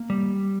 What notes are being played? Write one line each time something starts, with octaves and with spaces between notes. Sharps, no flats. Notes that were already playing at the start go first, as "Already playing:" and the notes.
Already playing: A#3
G3